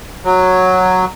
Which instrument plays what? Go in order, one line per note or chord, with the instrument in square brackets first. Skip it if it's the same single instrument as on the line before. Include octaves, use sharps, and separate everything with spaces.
[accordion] F#3